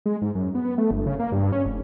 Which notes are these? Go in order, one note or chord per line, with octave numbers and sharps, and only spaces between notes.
G#3
G#2
F#2
B3
A3
G1
C#3
A#3
G2
C#4
F1